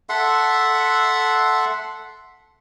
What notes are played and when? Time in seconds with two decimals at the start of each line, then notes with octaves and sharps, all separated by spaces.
0.09 A4 E5 F#5 C6